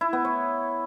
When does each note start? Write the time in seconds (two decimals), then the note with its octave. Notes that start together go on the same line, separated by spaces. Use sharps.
0.01 E4
0.13 B3
0.25 C#5